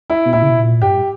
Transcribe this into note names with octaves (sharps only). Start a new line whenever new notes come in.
E4
B2
A#2 E4
C#3
B2
A#2
G2 G4